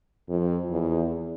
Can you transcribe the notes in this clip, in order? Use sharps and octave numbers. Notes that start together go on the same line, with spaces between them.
F2
E2